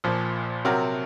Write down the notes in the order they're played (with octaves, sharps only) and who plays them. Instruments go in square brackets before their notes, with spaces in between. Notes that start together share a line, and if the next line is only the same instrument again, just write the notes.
[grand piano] A#1 A#2 F3
C3 F#3 C4 F#4 A#4